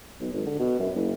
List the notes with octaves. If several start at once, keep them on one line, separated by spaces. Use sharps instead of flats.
B1
G#1
D3
B2
F#2
F#1